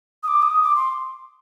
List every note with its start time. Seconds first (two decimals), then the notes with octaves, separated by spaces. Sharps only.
0.23 D#6
0.28 D6
0.42 D#6
0.63 D6
0.76 C6